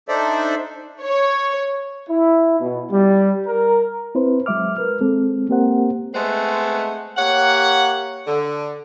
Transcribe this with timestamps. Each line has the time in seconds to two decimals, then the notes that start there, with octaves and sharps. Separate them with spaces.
0.08 D4 D#4 A4 C5 D5 E5
1.03 C#5
2.09 E4
2.59 B2
2.91 G3
3.46 A#4
4.15 C4 E4 B4 C5
4.46 F#3 G#3 E5 D6 F6
4.77 A#4 B4 F6
5.01 G#3 C4 A4
5.49 A#3 C4 G4 A#4 C5 F#5
6.14 G#3 A3 B3 C4 C5 F#5
7.17 A#3 G4 C#5 F#5
8.27 D3